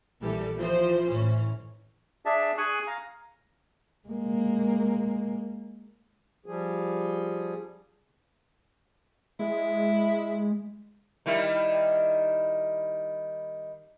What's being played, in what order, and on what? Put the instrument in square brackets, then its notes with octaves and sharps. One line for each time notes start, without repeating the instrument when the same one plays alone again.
[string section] A#1 E3 G3 A4
E3 F3 C5
A1 E3 C#4
[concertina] D4 G#4 D5 E5 A5
G#4 G#5 C#6 F#6
F5 A#5
[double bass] G#3 A#3
[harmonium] F3 G3 G#4
[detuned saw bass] G#3 [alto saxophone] E4
[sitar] D#3 G3 E4